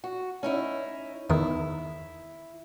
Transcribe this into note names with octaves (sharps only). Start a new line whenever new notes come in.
F#4
C#4 D#4 E4
E2 D#3 E4